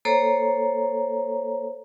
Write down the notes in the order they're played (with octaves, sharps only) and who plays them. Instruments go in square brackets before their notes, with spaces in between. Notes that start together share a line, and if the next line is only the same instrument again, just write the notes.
[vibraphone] A#3 A4 C5 C#5 A#5